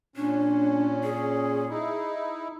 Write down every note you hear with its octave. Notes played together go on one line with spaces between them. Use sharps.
A#2 C#4 D4
G#4
D#4 E4